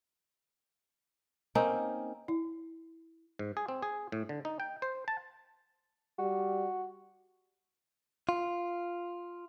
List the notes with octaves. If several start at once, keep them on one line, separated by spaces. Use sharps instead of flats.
A#3 C4 C#4 D#4
E4
G#2
G#4
C4
G#4
A2
D3
D#4
G5
C5
A5
G3 F#4
F4